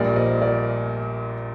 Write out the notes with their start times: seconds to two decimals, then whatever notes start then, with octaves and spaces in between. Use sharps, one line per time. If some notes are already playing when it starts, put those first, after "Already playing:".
Already playing: A#1 A#2 G3 A#4 D5
0.16 C5 D#5
0.41 A#4 D5